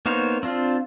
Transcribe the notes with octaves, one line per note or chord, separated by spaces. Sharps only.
A#3 B3 D#4 C5 C#5
C4 D4 F4